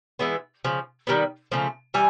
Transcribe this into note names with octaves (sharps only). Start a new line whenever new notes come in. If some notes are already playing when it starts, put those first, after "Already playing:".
E3 G#3 B3 E4
C#3 F3
D#3 G3 B3
C#3 F3 A3
E3 G3 G#5